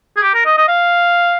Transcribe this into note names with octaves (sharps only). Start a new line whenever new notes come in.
G#4
G4
A#4
D#5
D#5
F5